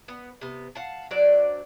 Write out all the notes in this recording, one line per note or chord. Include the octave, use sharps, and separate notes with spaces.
B3
C3 B3
F5 F#5 A5
F#3 D4 C5 D5